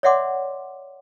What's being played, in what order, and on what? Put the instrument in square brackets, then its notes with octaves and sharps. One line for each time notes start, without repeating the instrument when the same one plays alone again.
[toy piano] C#5 D5 E5 F#5 C6 D6